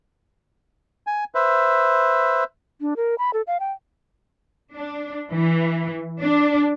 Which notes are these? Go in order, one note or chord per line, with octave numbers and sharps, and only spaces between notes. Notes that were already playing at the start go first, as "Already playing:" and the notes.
G#5
B4 C5 E5
D4
A#4
B5
A4
F5
G5
D4
E3
D4